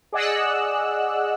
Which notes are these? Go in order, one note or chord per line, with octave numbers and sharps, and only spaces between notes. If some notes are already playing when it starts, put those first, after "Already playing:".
G#4 D5 D#5 F#5 E6 F#6